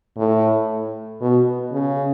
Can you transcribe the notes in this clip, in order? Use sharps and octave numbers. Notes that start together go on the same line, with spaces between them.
A2
B2
C#3